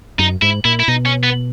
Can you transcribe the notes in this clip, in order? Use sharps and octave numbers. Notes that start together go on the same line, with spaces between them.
F#2 D#4
G#2 E4
A#2 E4
E4
B2 D#4
C#4
B3